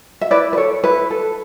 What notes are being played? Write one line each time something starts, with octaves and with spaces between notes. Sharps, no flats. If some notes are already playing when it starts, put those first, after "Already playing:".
E5
E4 B4 D5
B4
A4 C#5
E4 B4
A4